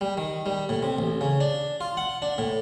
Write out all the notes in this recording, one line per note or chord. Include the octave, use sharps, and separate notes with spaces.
G3
D#3
G3
A2
C3
A1
C#3
D4
F4
F#5
D4
A2